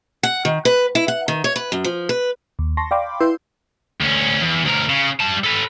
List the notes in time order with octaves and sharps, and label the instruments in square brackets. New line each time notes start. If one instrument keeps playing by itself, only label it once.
[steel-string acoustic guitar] F#5
D#3
B4
E4
F#5
D#3
C#5
B4
F#2
F3
B4
[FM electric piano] D#2
A5 C6 C#6 A#6
D5 F5 G5 B5 C6 D6
E4 B4 C6 E6 G6
[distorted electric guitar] D2 C#4
E2
D2 A#4
C#3
G3 A5
A4 B4